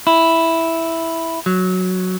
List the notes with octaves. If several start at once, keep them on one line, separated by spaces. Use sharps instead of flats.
E4
F#3